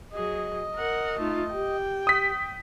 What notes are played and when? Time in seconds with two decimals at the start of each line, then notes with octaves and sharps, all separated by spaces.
0.13 F#3 G#4 D#5
0.75 A#4 F#5
1.19 A3 D#4 F4
1.53 G4 G5
2.07 D#6 B6